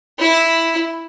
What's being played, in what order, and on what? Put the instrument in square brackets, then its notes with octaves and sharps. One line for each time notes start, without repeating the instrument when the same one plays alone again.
[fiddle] E4